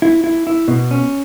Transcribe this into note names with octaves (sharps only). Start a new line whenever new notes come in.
E4
E4
E4
B2
C#4